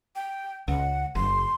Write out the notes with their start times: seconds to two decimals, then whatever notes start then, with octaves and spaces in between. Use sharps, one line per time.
0.16 G5
0.68 C#2 F#5
1.15 F#1 C6